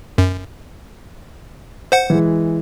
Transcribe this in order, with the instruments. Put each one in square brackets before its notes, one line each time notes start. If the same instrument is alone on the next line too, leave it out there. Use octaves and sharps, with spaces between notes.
[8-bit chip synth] F#2
C5 F#5
[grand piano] E3 G#3